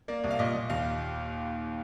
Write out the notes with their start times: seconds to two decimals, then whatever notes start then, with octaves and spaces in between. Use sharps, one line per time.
0.08 A#3 D5
0.24 C2
0.31 F5
0.39 A#2 D#5
0.55 A#2
0.69 D#2 F5